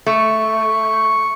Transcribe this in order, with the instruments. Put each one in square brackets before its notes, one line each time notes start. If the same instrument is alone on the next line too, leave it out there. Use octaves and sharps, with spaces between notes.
[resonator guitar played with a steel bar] A3 [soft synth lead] C#6